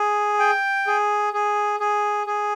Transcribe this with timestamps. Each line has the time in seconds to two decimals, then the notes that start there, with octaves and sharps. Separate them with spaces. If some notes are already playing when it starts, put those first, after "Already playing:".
Already playing: G#4
0.39 G5
0.87 G#4
1.33 G#4
1.80 G#4
2.27 G#4